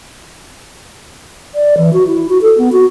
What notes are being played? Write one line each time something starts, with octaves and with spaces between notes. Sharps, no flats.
D5
E3
F#4
E4
F#4
A4
B3
F#4